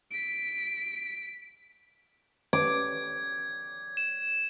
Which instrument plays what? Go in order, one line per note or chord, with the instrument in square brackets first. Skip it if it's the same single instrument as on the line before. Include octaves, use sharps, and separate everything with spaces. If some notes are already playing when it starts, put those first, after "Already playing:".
[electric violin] B6 D7
[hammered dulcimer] D6 [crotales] G#6
[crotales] E7